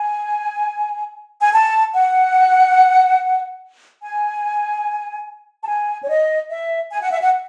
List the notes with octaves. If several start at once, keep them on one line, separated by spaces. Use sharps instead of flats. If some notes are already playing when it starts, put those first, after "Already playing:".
Already playing: G#5
G#5
A5
F#5
G#5
A5
G#5
C#5
D#5
E5
G#5
F#5
E5
F#5